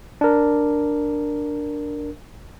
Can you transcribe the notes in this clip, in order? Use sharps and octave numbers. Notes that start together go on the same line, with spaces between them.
D4 A#4